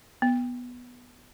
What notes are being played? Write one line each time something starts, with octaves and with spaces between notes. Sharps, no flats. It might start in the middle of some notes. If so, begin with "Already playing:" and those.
B3